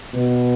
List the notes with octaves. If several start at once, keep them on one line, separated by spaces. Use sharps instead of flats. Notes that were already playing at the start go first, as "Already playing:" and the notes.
B2